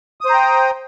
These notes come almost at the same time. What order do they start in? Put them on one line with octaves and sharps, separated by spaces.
D#6 C5 A#5 G5